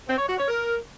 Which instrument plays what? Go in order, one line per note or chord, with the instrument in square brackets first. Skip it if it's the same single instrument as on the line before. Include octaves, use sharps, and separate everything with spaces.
[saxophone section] C4
C#5
F#4
C#5
A#4